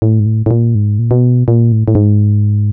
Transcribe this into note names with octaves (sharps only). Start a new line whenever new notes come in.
A2
G#2
A2
A2
A#2
G#2
A#2
B2
A#2
A2
A2
G#2